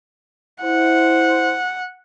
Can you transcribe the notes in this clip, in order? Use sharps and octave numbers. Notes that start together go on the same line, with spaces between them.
E4 C5 F#5